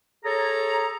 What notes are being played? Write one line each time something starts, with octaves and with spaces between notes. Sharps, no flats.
G#4 A4 C#5 A#5